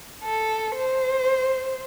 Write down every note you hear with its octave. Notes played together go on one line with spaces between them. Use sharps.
A4
C5